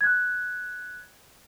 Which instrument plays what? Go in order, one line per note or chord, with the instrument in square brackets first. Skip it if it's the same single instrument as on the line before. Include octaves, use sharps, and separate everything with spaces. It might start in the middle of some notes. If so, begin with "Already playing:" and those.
[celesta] F#6 G#6